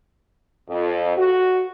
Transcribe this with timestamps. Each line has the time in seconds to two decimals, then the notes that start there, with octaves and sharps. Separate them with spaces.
0.69 F2
1.18 F#4